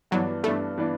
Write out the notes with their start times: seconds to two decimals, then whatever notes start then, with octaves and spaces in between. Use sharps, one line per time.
0.11 G2 E3 F#3 B3 D4
0.43 G2 E3 A3 B3 D4
0.78 E3 B3 D4